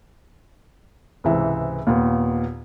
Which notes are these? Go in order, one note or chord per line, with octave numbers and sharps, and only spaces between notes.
C#2 G#2 C3 E3 E5
D#2 A#2 B3